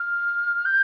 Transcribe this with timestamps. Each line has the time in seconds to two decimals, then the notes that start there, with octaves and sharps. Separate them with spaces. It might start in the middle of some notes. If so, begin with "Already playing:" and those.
Already playing: F6
0.65 G6